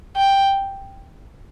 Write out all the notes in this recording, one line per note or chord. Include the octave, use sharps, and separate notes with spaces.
G5